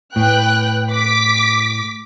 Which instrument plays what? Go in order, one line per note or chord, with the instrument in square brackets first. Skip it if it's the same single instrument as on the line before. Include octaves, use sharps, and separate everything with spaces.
[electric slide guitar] A2 [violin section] B4 G5 F#6
[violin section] D6 B6